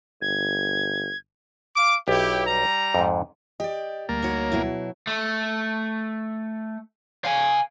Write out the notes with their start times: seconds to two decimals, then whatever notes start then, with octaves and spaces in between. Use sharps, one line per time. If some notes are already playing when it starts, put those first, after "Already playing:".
0.22 G1 G#6
1.76 F5 D6
2.08 B1 E4 G4
2.47 G3 A#5
2.95 F2 G#2
3.60 G4 D5 D#5
4.09 D2 G3 A#3 A6
4.23 D#4 F#4 C#5
4.52 B2 F#3 E4
5.07 A3
7.25 F5 G#5